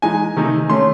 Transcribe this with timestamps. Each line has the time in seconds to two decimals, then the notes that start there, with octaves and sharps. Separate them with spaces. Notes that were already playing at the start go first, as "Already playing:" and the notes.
0.02 E3 G#3 D#4 G#5
0.36 C3 D#3 A3 D#4
0.69 D#3 A3 C#4 C6